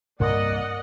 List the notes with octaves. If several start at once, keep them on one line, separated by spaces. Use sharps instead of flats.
C2 G2 A#3 A#4 D5 D#5 F#5